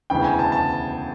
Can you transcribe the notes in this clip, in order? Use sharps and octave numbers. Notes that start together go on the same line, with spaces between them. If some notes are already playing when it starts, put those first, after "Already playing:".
E1 D2 C#3 E3 G5
G#5
A5
A5